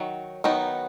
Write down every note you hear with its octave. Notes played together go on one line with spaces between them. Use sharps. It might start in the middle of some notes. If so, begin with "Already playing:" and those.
Already playing: D#3 F#3
D#3 F#3 B3 D#4